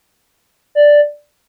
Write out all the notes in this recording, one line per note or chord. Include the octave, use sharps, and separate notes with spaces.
D5